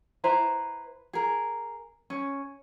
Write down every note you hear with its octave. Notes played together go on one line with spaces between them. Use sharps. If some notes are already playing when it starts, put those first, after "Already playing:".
E4 B4 C5 A#5
G#4 A#4
C#4